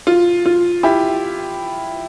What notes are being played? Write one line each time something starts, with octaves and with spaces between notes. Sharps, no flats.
F4
F4
E4 G4